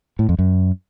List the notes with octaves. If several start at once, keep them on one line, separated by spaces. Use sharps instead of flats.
A2
F2
F#2